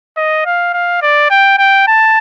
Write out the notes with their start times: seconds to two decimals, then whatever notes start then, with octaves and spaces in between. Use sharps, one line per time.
0.17 D#5
0.46 F5
0.74 F5
1.02 D5
1.30 G5
1.58 G5
1.87 A5